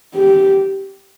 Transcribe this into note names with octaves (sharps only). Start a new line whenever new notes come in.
G4